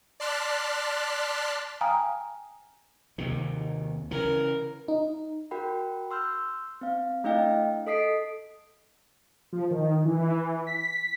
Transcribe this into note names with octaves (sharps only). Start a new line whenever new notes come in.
D5 A5 C6 F6 F#6 B6
F5 G5 G#5 A#5 D#6 F6
D#2 C3 D#3
C#3 E3 A#4
D#4
F#4 A#4 F#5 G5 B5
C6 E6 F6 G6
C4 F5
A3 D4 E4 D#5 F5 G5
A4 D#5 D#6 B6 C7 D7
F3
D#3
E3
B6